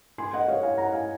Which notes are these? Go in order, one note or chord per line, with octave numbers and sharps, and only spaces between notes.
G#5 C6
D#5 F#5
C#5 F5
F5 G#5
F#5 A#5
F5 G#5